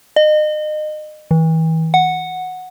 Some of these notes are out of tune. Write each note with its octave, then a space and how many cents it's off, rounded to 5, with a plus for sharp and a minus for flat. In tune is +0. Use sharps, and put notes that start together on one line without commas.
D#5 -30
E3 -35
F#5 -5